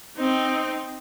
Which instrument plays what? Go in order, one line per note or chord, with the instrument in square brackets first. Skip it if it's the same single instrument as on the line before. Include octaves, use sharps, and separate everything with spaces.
[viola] C4 D#4